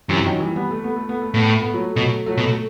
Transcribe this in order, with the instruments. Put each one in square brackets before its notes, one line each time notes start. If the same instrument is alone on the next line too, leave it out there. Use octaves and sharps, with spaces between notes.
[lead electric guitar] F#2 [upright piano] C3 E3
[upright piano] D#3 F#3
E3 G3
G3 B3
A3
B3
A3
B3
A3
[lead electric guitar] A2 [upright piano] B3
[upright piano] A3
B3
F#3 A3
[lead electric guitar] B2 [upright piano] F#3 A3
[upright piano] F#3 A3
[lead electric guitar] B2
[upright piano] A3